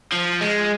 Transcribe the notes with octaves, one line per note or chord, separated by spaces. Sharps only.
F3
G#3